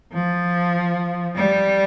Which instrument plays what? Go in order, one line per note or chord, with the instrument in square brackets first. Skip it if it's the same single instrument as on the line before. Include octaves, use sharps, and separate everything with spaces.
[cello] F3
G3